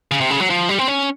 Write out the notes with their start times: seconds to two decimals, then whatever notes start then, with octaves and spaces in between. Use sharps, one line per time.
0.11 C#3
0.21 C3
0.30 C#3
0.40 F#3
0.50 F3
0.69 G3
0.79 C4
0.88 C#4